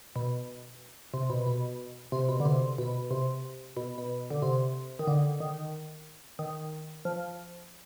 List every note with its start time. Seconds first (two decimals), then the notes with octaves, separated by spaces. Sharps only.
0.16 B2
1.14 C3
1.30 B2
1.47 B2
2.12 C3
2.29 B2
2.40 D3
2.45 C3
2.78 B2
3.11 C3
3.77 B2
3.98 B2
4.30 D3
4.42 C3
4.99 D#3
5.07 D3
5.40 D#3
6.39 D#3
7.05 F3